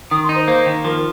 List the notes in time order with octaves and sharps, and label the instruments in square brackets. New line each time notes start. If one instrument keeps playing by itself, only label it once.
[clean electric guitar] D#3 [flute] D#6
[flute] C6
[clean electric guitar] D#4
[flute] C5
[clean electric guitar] A#3 [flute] C5
[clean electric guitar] D#3
[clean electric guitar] F3 [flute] A#4